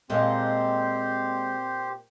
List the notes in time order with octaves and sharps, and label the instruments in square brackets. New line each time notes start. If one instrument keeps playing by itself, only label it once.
[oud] A#2 A#3 [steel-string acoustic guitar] G#3 A4 D#5 [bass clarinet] C4 [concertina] G4 C5